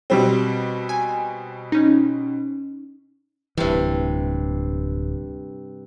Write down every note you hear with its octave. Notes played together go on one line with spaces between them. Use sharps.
B2 G3 C4
G#5
C#4 D#4
D1 G2 C3 E3